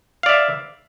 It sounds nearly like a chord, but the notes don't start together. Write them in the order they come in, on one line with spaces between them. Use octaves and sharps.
F5 D5 E5